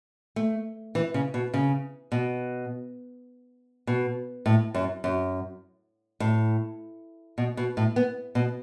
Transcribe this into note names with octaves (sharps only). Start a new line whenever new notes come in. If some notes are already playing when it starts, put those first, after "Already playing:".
A3
E3
C#3
B2
C#3
B2
B2
A2
F#2
F#2
A2
B2
B2
A2
B3
B2